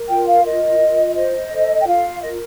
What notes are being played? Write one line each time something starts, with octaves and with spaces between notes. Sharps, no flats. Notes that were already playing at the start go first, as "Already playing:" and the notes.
Already playing: A#4
F4 G5
F5
A#4 D#5
F4
C5 D#5
A4
G5
F4 F5
A#4 D#5